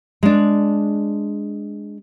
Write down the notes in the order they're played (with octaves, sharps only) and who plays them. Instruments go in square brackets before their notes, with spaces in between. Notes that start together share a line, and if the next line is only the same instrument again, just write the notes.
[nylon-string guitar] G#3 D4